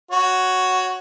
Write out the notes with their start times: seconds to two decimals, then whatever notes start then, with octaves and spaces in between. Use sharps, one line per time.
0.11 F#4 C#5